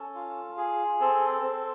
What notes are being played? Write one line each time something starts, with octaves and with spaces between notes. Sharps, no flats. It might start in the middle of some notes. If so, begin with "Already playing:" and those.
Already playing: C#4 A4
F4
G#4
C4 A4
C4